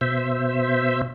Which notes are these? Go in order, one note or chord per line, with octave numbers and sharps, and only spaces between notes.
B2 C5 E5